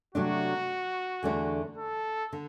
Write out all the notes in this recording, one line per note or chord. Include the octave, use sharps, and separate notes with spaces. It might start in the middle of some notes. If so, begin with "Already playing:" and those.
C3 F#3 A3 D4 F#4
E2 D3 A3 D4
A4
D3